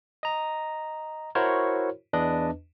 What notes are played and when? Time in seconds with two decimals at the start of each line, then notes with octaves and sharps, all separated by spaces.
0.23 D#5 A#5
1.35 E4 F#4 A#4 C5 C#5
2.13 E2 D4 B4 D#5